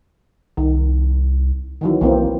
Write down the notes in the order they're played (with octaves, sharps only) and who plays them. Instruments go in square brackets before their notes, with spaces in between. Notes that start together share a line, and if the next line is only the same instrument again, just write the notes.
[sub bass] C2 [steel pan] D#3
[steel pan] D#3 E3 F#3
[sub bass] B1 [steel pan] E3 A#3 C4